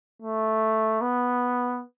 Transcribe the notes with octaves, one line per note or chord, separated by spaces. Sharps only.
A3
B3